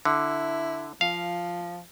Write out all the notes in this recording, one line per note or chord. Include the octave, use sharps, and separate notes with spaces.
D3 E4
F3 F5